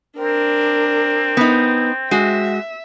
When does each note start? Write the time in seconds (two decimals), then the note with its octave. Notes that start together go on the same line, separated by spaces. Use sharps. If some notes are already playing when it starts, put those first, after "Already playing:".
0.19 C4 D4 A#4
1.37 B3 D#4
2.11 G#3 F#4 E5